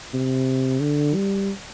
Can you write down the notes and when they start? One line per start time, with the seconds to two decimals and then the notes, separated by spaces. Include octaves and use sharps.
0.14 C3
0.81 D3
1.15 G3